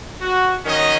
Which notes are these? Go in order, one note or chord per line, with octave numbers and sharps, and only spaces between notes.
F#4
D#3 F#3 C#4 D#5